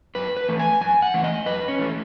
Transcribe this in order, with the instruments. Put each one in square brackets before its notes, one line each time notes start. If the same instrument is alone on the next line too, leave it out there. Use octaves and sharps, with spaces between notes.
[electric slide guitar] F#2 B4
B4
E3 A3
G#5
F#2 G#5
F#5
E3 A3
D#5
F#2 B4
C#4
E3 A3